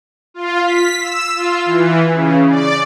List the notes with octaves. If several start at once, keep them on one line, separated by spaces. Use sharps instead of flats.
F4
B6
E6
F4
E3
C#3
D5